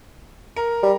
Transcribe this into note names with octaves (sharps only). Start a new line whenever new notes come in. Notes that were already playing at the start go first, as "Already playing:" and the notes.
A#4
G3